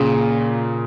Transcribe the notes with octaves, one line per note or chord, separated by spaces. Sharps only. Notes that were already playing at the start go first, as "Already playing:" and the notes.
Already playing: A#2 C#3